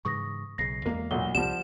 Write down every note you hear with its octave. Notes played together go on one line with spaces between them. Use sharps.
G#2 C#3 E3 C#6 D#6 A#6
B1 C#3 A#6 C7
E2 G#3 A#3
B1 A#2 G7
C2 F3 G3 F#5 E7